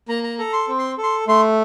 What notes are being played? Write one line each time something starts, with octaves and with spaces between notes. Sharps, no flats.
A#3 A#5
A#5
A4 A#5
C6
C4
C6
A4
C6
A3 C6